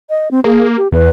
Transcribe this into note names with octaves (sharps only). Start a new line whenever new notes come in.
D#5
C4
A#3 G#4
G4
E2 B4